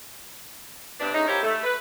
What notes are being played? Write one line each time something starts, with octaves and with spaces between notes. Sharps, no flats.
G2 C3 B3 D4
G#3 A3 C#4 D#4
E4 F4 G4 A#4 C5 C#5
A3
B4